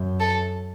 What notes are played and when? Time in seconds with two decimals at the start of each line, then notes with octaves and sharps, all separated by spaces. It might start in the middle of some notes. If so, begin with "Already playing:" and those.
Already playing: F#2
0.20 A4